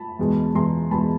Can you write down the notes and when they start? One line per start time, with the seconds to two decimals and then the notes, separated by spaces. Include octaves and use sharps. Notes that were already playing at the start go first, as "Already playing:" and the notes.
Already playing: A5 B5
0.19 E2 B2 G#3
0.55 E2 B2 G#3 A#5 C6
0.91 E2 B2 G#3 A5 B5